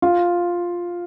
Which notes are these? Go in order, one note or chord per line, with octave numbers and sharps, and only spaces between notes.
F4